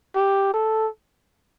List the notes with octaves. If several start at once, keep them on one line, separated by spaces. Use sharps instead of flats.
G4
A4